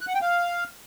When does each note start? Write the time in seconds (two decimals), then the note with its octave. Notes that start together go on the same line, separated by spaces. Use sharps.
0.01 F#6
0.08 F#5
0.15 G5
0.22 F5